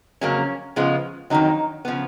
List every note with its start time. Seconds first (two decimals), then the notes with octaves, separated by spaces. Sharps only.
0.21 F2 C#3 F#3 A#3 C#4
0.76 C#3 F3 G#3 B3
1.30 F2 D#3 F#3 D#4
1.85 C#3 F3 B3